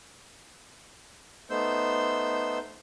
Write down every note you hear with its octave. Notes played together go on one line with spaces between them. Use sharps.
A3 B3 D#4 C5 E6 G6